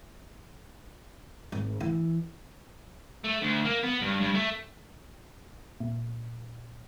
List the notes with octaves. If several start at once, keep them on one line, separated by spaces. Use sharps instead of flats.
G#1
E3
A3
D2
A#3
B3
G2
G2
A3
A#2